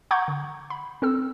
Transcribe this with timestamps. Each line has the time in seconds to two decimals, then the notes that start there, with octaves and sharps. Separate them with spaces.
0.11 F#5 A#5 C#6 D6 G6 G#6
0.28 D3
0.70 B5
1.02 C4 A4 E6